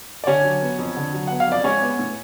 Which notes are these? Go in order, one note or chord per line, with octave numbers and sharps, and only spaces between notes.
D5
D3 C#4 C#5
F#3
B3
F2
D3
F#3
B3 F#5
F5
F2 D5
G#3 C#4 C#5
B3
A2